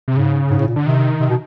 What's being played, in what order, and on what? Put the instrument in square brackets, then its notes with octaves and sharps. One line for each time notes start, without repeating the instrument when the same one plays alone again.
[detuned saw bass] C3
[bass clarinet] G#2 [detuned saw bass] C#3
[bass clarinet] G#2
A2
A#2
[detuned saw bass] D3
[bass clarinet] C3 [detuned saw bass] D#3
[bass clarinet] C3
B2